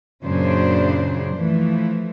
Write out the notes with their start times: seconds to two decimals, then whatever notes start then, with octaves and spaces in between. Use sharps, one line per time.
0.23 F#2 A#2 C#3 F#3 D4 C5
1.36 E3 F3 A3